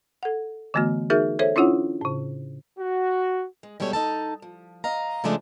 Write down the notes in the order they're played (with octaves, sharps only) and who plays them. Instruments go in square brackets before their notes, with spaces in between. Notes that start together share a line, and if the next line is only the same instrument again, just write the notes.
[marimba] A4 F#5
D3 E3 A3 B3 F#4
D#4 F#4 G#4 A#4 E5
A4 C5 C#5 E5
C#4 D4 E4 F4 C#5 F#5
A2 C#3
[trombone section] F#4
[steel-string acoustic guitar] G#3
B2 G3 G#3 A4 C#5
D#4 A4 A5
F3
D#5 F5 A#5
C#3 F3 G#3 A3 D4